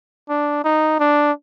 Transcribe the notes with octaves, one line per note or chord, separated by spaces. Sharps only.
D4
D#4
D4